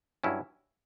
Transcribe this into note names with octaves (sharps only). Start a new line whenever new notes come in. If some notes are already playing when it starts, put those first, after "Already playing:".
G2 F#3 C#4 E4